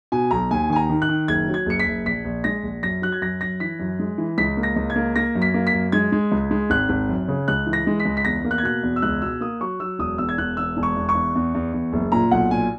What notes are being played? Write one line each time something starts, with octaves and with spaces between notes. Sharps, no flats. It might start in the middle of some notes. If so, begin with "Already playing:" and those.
B2 G#5
B1 A#5
D#2 G#5
D#3 G#5
A#5
D#3
F#6
D#3
F#1 G#6
F#3
G#6
F#1 C#7
B6
F#1
A#1 B6
A#1
G#3 A#6
A#1
F#2 A#6
F#3 F#6
G#6
F#2 A#6
F#2 A#6
E3 B6
F#2
G#3
E3
C#2 B6
A#3
A#6
C#2
G#6
A#3
A#3 A#6
F#2
B6
A#3
B6
F#2
G#3 G#6
G#3
C#2
G#3
G#1 F#6
G#1
F#2
C#3
C#2 F#6
E3
A#6
G#3
B6
C#2
B6
E2 A#6
A#3
F#6
G#6
B2 F#6
E2
E6
C#2 F#6
B2 E6
A#3 D#6
F#3 C#6
F#3 E6
E1 D#6
E2 E6
G#6
E1 F#6
E2 E6
E1
C#6
E2
C#6
E2
E2
E2
E2
F#1
A#2 A#5
B1 F#5
A#2 G#5